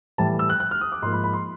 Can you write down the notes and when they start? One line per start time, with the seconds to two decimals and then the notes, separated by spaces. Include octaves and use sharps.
0.18 A2 E3 G3 A5
0.39 E6
0.50 F#6
0.60 F#6
0.71 F6
0.81 D#6
0.92 D6
1.02 G#2 F3 A#3 C6
1.12 B5
1.24 B5
1.33 C6